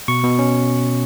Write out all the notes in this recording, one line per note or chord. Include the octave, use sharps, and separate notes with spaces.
B2 C#6
B2
C#4